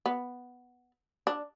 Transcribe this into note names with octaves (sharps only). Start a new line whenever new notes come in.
B3
D4